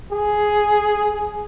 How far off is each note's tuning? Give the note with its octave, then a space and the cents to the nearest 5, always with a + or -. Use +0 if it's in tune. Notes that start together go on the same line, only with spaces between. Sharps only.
G#4 +5